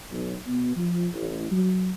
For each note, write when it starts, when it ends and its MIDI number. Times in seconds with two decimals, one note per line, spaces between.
0.10 0.34 35
0.47 0.73 47
0.76 1.06 53
1.14 1.48 33
1.51 1.91 54